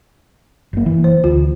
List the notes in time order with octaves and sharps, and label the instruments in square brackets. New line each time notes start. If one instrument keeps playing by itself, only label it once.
[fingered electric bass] F#1 A#3
E3
[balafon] C5
[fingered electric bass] D2 [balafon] F4